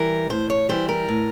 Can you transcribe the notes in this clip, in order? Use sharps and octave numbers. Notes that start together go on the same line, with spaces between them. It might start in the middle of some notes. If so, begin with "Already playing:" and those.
Already playing: E3 G3 A#4
A2 C5
C#5
E3 G3 C5
A#4
A2